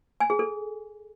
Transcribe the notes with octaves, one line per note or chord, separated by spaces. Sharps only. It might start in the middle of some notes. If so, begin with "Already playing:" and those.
G#5
G#4
A4